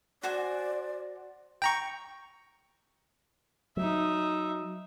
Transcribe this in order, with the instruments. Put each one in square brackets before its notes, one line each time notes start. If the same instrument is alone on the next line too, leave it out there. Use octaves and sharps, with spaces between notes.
[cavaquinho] F#4 C5 G#5 [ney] D5
[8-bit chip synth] G5 A#5 C#6
[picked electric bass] F#3 [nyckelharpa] D#4 E5